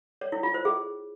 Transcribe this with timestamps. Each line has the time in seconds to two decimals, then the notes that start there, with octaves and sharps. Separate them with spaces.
0.21 C#5
0.32 E4
0.43 F4
0.54 C5
0.65 G#4